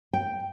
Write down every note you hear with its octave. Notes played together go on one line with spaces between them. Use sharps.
G5